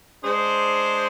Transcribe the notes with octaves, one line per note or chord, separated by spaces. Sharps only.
G#3 D4 G#4 C5